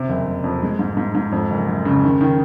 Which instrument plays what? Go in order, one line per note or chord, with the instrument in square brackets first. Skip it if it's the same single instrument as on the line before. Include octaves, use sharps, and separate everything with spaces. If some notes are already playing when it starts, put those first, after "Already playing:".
Already playing: [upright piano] C3
F#1
F#1
F2
G#3
G#2
G#2
G#2
F2
F#1
F#1
C#3
D#3
D#3